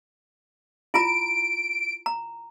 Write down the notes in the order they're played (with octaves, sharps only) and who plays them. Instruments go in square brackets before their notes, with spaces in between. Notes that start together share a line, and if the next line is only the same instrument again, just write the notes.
[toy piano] E4 F4 A#5 [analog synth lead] D7
[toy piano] A#5